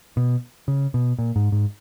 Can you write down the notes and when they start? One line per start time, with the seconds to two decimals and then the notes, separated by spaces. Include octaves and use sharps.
0.17 B2
0.68 C#3
0.94 B2
1.19 A#2
1.36 G#2
1.52 G#2